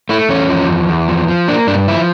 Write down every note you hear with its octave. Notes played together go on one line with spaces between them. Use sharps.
A3 E4
E2 C#4
F3
E2
E2
F3
F3
A#3 D4
G2 D4
F3 E4